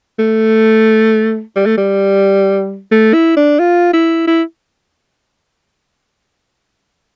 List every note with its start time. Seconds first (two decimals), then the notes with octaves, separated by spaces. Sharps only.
0.19 A3
1.56 G3
1.66 A3
1.78 G3
2.91 A3
3.14 E4
3.37 D4
3.59 F4
3.93 E4
4.27 E4